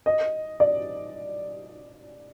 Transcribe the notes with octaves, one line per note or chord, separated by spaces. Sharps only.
D#5
D5